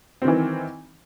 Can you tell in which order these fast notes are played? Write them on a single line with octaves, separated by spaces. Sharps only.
C4 D#3 E3